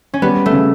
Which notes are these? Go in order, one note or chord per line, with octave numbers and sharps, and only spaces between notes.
C#4
G3 B3
A3
C#3